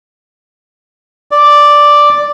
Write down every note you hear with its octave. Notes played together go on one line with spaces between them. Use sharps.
D5